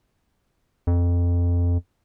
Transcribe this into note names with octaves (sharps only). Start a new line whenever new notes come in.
F2